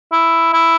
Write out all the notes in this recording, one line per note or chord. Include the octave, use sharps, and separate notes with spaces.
E4
E4